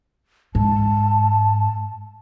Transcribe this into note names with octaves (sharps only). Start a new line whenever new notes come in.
G#2 A5